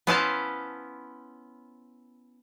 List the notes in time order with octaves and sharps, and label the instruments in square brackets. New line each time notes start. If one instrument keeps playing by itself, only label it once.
[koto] B3 C#4 E4 C5 F5 A5